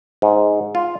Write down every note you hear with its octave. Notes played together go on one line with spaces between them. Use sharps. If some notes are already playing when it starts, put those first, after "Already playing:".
G#2
F4